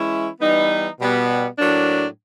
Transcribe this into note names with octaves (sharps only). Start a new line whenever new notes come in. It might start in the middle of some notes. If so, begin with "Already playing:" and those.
Already playing: E3 G#3 C#4 E4
E3 G3 B3 D#4
B2 G3 B3
A2 F#3 A#3 D4